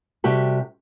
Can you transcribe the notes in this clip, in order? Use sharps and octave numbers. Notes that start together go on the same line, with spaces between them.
C3 G3 F#4 G4 A4